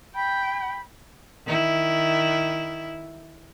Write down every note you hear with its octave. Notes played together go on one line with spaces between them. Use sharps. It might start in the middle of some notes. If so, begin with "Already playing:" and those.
G5 B5
D#3 E4